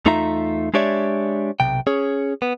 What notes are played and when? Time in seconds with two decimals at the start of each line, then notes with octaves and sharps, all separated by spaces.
0.06 E2 A3 D#4 F4 E5 A#5
0.74 G#3 D4 G4 C#5 D5 E5
1.60 B1 C3 G5
1.87 C#4 G#4 C#5
2.42 B3